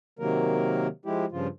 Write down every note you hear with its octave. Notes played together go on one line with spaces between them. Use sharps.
C3 D#3 F#3 A#3 A#4
F3 G#3 E4 G4
G2 C#3 F3 F4